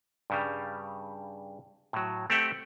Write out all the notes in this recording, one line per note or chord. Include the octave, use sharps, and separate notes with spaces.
G2 C#3 G3
A2 F#3
A3 C4 G4 E5 F#5 G5